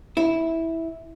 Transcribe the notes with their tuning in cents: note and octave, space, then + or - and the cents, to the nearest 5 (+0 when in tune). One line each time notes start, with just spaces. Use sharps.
E4 -10